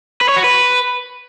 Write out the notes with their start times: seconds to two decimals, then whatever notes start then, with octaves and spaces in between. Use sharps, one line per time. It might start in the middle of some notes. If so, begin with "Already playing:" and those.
0.21 B4
0.29 C#5
0.36 F#4
0.44 B4